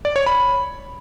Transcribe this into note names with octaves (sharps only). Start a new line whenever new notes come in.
D5
C#5
B5